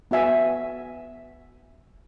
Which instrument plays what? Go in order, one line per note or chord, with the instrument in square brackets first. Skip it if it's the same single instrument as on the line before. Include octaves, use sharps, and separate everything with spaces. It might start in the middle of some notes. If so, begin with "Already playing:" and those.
[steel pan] B3 F#4 E5 G#5